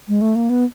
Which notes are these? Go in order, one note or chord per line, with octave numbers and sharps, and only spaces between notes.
G#3
A3
A#3
B3